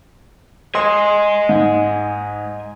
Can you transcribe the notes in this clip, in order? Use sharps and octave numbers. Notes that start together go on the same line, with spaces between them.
D#5 G#5 C6 D#6
G#2